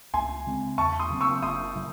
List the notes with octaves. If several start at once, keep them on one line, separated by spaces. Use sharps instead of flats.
C#2 G#5 C6
C#3 G#3 C4
E2 A5 C#6
C6 D#6
C#3 F#3 C4
C#6 E6
F#1 C6 D#6
C#3 F#3